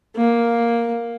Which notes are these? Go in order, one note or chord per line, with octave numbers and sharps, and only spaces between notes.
A#3